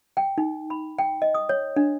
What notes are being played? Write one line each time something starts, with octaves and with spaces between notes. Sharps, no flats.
G5
D#4
B5
G5
D#5
D#6
C#5
D4